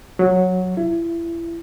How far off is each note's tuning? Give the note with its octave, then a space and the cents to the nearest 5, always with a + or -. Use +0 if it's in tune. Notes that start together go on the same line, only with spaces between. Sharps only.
F#3 -10
E4 +30